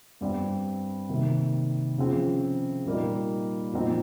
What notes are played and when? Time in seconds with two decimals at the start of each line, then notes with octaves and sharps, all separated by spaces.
0.21 G2 G3 C4
1.09 C3 D#3 A#3
1.98 C#3 F3 C4
2.86 A#2 G3 A#3 D#4
3.73 A#2 F3 C4 D#4